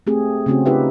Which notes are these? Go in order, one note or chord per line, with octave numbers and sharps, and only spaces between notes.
A3 C4 G4 G#4
C#3 A3 C4 C#4 F#4
D#4 F4 G4 B4 E5